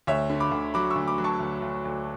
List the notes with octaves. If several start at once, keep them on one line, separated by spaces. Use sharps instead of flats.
D2 C#5 E5
D3
B5 D6
D2
F#3 B5 D6
C#6 E6
D2
B5 D6
F#3
A5 C#6
D2
D2
D2